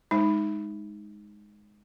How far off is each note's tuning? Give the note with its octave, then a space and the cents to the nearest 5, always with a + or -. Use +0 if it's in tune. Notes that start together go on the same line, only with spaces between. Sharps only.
G#3 +0 D#4 +0